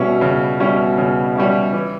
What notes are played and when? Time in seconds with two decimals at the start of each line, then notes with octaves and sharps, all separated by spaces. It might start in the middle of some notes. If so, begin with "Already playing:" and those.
Already playing: B2 G3 C#4 E4
0.21 C#3
0.60 G3 C#4 E4
0.97 C#3
1.36 G3 C#4 E4
1.73 E3